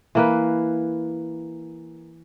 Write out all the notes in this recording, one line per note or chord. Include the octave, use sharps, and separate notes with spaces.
E3 A#3 B4